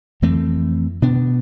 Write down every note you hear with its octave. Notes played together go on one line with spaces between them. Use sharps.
F2 E3 A3 C4
B2 B3 D4